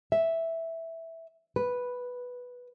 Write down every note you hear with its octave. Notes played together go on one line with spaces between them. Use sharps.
E5
B4